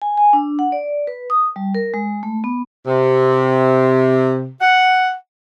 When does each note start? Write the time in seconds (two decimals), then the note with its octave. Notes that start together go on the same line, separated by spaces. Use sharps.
0.02 G#5
0.17 G#5
0.33 D4
0.59 F#5
0.72 D5
1.07 B4
1.30 D#6
1.56 G3
1.74 A#4
1.94 G#3
2.23 A3
2.44 B3
2.86 C3
4.60 F#5